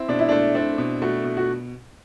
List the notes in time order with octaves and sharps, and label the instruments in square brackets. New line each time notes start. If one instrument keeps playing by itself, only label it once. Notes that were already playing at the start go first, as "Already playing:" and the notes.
Already playing: [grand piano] C4 [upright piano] E4
[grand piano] B2 [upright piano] D4
[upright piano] E4
[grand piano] A3 [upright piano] D4
[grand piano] C4 [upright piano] D4
[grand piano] B2
[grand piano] A3 [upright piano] F#4
[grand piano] B2
[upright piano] F#4